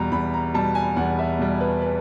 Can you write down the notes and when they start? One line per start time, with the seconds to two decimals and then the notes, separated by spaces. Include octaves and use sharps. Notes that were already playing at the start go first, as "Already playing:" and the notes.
Already playing: E2 B2 G3 A#5
0.12 E2 B5
0.34 A#5
0.54 B2 G3 A5
0.75 G#5
0.97 E2 F#5
1.19 E5
1.39 B2 G3
1.60 B4
1.82 B4